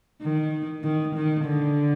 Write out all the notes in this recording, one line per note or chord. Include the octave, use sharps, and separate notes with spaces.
D#3
D#3
D#3
D3